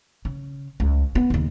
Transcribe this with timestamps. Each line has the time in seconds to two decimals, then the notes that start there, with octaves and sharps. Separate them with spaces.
0.25 C#3
0.80 C#2
1.15 B3
1.30 D#2 C#3